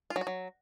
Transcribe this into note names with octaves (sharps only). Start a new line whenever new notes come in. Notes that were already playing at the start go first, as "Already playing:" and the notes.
F4
F#3
F#4
F#3